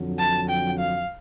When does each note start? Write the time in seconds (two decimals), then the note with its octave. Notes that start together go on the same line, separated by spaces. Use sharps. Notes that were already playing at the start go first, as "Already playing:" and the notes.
Already playing: F2 D3 F#3
0.19 A5
0.49 G5
0.79 F5